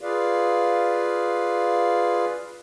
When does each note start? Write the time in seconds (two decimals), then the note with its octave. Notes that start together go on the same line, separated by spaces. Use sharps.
0.01 F4 G#4 B4 D5 F5